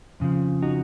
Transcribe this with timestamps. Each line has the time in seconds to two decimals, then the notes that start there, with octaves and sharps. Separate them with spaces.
0.20 F2 C#3 F3
0.63 D#4 F#4